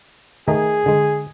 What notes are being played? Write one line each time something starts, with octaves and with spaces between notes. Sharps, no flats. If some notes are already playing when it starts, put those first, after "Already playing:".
D#3 A3 D#4 G#4
D3 G#3